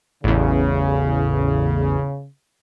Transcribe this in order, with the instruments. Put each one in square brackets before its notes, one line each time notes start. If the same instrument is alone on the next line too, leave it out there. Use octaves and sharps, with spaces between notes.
[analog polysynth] A1 E2 [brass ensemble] C#3